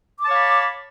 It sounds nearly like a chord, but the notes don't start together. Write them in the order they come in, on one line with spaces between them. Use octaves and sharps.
D6 A5 C#5 F5 B5